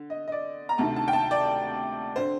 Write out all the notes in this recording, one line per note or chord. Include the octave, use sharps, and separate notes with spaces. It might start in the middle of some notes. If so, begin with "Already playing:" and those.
Already playing: D3
D#5
D#5
D5
A#5
D2 C3 D#3 A5
A5
G5
A5
D5
D3 C5